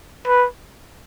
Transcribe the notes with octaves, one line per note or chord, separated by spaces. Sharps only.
B4